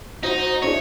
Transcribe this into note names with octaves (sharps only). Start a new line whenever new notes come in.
D#4 F#4 C5
D4 E4 G#4 C#5